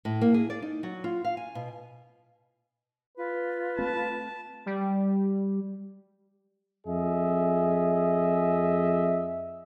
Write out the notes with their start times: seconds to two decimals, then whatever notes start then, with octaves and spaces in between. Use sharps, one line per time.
0.05 A2
0.21 A#3
0.34 G#4
0.50 D5
0.62 D#4
0.83 F#3
1.04 F4
1.25 F5
1.37 G#5
1.55 B2
3.17 F4 B4
3.79 A3 C4 A5
4.66 G3
6.87 F2 G#4 D#5 E5